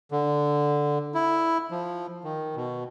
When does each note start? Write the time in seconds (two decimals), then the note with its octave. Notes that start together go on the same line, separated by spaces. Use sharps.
0.11 D3
1.14 E4
1.71 F3
2.24 D#3
2.56 B2